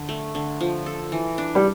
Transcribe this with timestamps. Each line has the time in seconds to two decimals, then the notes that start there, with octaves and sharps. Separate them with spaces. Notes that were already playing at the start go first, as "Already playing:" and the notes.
Already playing: D3
0.09 A3
0.35 D3
0.61 F3
0.86 A4
1.12 E3
1.38 D4
1.55 G3